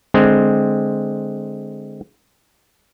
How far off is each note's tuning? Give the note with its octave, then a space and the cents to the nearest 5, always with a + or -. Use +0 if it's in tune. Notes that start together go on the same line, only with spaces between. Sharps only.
D3 +20 G#3 +10 C4 +0